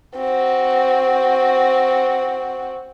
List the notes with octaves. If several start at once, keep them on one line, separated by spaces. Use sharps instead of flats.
C4 F#4